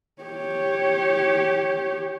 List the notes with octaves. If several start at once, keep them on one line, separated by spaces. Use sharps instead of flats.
G4 C#5